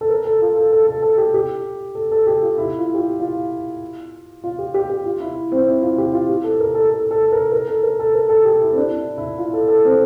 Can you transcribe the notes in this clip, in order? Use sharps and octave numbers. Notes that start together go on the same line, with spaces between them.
A4
A#4
A4
F4
A4
A4
A4
A4
G4
G4
A4
A4
G4
F4
E4
F4
G4
F4
F4
F4
G4
G4
G4
F4
E4
C4
E4
F4
G4
F4
G4
A4
A#4
A4
A4
A4
A#4
A#4
A4
A#4
A4
A#4
A4
G4
E4
C4
D4
E4
E4
F4
A4
A4
C4